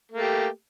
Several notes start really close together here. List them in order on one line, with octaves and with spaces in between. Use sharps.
A#3 A3 G4